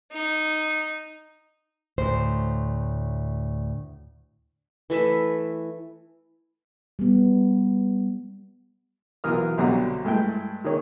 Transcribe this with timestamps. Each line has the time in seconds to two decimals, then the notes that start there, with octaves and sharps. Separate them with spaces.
0.12 D#4
1.98 D2 A2 C5
4.90 E3 A3 B4 E5
6.99 G3 B3
9.24 B1 E3 F4 A#4 D#6 F6
9.58 C2 B2 D3 F#3 G4 A#5
10.04 G2 G#3 A3 E4 G5
10.64 D#3 A#3 G#4 C#5